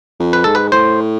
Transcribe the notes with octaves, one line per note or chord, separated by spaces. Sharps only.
F2
B4
G#2 A4
B4
A2 C5